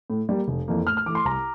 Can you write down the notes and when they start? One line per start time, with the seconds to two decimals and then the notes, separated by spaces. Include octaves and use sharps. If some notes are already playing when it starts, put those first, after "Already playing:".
0.10 A2
0.29 G3 A#3
0.48 F1
0.68 F2 E3 A#3
0.87 A2 F6
0.97 F6
1.06 E3 A3 D6
1.15 C6
1.25 C2 A#5